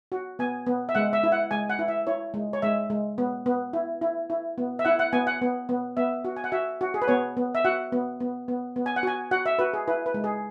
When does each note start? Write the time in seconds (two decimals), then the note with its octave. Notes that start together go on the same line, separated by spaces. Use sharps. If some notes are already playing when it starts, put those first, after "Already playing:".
0.12 F#4
0.39 B3 G#5
0.67 B3
0.89 E5
0.95 G#3 F#5
1.13 E5
1.23 E4
1.32 F#5
1.51 G#3 G#5
1.70 F#5
1.79 E4
1.88 E5
2.07 E4 C#5
2.34 G#3
2.53 C#5
2.62 G#3 E5
2.90 G#3
3.18 B3
3.46 B3
3.73 E4
4.02 E4
4.30 E4
4.58 B3
4.79 E5
4.85 E4 F#5
4.99 F#5
5.13 B3 G#5
5.27 F#5
5.42 B3
5.69 B3
5.97 B3 E5
6.25 F#4
6.37 G#5
6.44 F#5
6.52 F#4 E5
6.81 F#4
6.94 G#4
7.02 B4
7.08 B3 C#5
7.37 B3
7.55 E5
7.65 F#4 F#5
7.92 B3
8.20 B3
8.48 B3
8.76 B3
8.86 G#5
8.96 F#5
9.03 F#4 G#5
9.31 F#4 F#5
9.46 E5
9.59 F#4 B4
9.74 G#4
9.88 E4 B4
10.06 B4
10.14 G#3
10.24 G#4